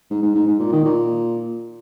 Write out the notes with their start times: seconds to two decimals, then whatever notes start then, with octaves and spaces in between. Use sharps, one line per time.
0.11 G#2
0.23 G#2
0.35 G#2
0.47 G#2
0.60 A#2
0.72 D#3
0.84 A#2